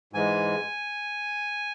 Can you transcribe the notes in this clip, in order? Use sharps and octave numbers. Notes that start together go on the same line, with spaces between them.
G#2 E3 G#3 G#5